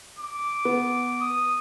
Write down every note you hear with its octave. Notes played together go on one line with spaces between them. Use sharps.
D6
B3
D#6